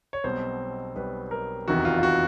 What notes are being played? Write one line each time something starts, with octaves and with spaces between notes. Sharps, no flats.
C#5
B1 B2 G3 C4 C5
B1 B2 G3 C4 B4
A#4
F1 E2 C3 D#3 F#4
F4
F4
F#4